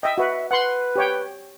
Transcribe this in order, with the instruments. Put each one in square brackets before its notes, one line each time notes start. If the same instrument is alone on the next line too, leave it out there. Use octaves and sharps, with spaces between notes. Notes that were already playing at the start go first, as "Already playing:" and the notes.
[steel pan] D#5 E5 [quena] G5
[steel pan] F#4 B4 [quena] E5
[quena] B4 [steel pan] F#5 C6
[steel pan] G4 C#5 G5